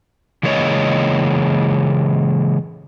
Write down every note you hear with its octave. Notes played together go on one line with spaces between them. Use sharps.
C#3 E3 G#3 A#3 C#5 D#5